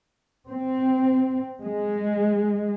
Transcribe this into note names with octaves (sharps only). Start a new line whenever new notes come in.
C4
G#3